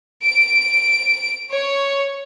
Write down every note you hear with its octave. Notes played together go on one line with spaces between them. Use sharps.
D7
C#5